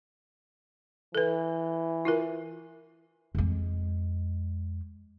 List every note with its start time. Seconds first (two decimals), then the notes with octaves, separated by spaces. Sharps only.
1.15 E3 A4 B4
2.05 E4 F4 A#4
3.35 F2 G#3